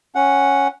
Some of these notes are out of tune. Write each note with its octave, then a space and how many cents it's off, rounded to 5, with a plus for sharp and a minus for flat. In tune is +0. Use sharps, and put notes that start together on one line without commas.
C#4 -5 F#5 +0